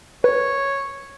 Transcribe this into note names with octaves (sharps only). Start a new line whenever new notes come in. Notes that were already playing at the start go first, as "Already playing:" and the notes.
B4 C#5